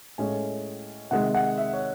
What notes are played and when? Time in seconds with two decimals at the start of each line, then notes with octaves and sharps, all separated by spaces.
0.18 A2 G#3 C#4 G#5
1.11 C3 D#3 G#3 F#5
1.34 F#5
1.58 E5
1.73 C#5